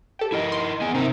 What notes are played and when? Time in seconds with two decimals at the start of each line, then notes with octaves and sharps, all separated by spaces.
0.19 G4 A4
0.32 E4 A#4 D#5
0.52 C6
0.81 B3 G#4 G#5
0.95 C3 C4 D#4 A#4 E5